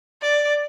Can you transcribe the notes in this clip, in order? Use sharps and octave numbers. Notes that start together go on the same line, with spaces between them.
D5